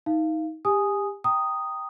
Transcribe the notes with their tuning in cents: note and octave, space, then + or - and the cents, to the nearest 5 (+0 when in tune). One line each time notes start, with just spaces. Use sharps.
D#4 +25 F5 -20
G4 +30 G#5 +0 D#6 +0
G5 +0 A#5 -10 D#6 +0